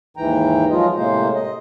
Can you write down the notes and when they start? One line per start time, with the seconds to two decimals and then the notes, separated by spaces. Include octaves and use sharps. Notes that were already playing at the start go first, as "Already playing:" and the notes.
0.17 D#2 G#2 E3 G5 A#5
0.70 F3 F#3 G#3 F4 D#5
0.95 A2 C3 G#3 A#3 C5
1.34 D#5